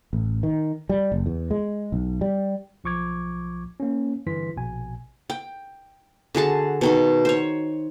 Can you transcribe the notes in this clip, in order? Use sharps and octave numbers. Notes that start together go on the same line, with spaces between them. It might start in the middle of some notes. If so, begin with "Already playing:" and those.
A1
D#3
G3
F#1
E2
G#3
B1
G3
B1 F3 C#6 D6 G#6
A#3 C#4
G2 D3 E3 C6 B6
A#1 B2 G#5
G5
D3 F#4 G#4 A5
B2 D#3 C6
C5 C#5